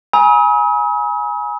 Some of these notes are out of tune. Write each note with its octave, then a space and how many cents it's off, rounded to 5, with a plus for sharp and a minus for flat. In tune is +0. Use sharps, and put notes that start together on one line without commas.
G#5 +5 B5 -45 D#6 +45